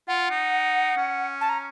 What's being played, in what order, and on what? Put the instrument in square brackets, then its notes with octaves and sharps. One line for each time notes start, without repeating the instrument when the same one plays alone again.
[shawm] F4 [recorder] F#5
[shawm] D#4
C#4
[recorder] A5
A#5